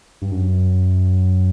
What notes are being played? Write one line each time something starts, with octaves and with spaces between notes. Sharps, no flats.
G2
F#2